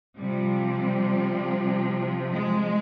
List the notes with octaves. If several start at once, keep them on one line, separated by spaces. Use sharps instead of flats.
C3 F3 G3
G#3